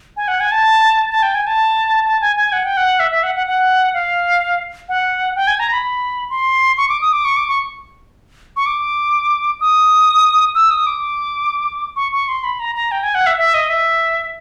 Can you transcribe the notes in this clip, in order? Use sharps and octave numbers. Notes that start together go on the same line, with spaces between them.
G#5
F#5
G#5
A5
A5
G5
G#5
A5
A5
G#5
G#5
F#5
G5
F#5
E5
E5
F#5
F#5
F#5
F5
F#5
G5
G#5
A#5
B5
C6
C#6
D6
D#6
D6
C#6
D6
C#6
C#6
D6
D#6
E6
D#6
D6
C#6
C#6
C6
B5
A#5
A#5
G5
G#5
F#5
E5
E5
D#5
E5